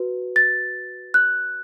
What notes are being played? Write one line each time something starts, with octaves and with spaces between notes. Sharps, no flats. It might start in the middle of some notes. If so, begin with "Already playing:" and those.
Already playing: F#4 B4
A6
F#6